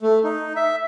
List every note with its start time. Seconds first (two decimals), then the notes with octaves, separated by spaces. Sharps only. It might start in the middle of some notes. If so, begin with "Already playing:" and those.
0.02 A3
0.24 D#4
0.56 E5